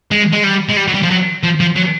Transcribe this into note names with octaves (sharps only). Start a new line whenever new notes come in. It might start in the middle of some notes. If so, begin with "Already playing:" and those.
G#3
G#3
G3
G#3
G3
F#3
G3
F3
F#3
F3
F3
F#3